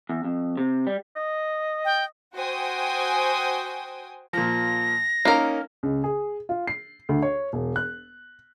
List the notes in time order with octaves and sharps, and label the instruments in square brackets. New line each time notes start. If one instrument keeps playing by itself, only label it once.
[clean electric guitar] E2
F2
C3
G3
[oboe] D#5
[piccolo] G5
[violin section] F#4 C5 G5 G#5 D#6
[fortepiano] A#2 F3 [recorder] A#6
[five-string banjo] A#3 A#4 [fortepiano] C#4 D#4
[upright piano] C#2
G#4
F4
C7
D2
C#5
E1
F#6